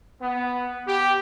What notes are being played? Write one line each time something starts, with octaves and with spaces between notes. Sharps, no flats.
B3
G4